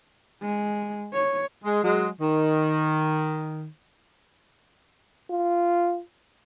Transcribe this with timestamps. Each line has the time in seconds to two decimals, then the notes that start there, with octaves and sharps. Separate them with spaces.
0.41 G#3
1.14 C#5
1.64 G#3
1.83 F#3 G#3
2.21 D#3
5.30 F4